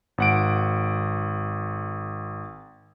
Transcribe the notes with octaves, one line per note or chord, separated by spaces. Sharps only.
G#1 F#5 D7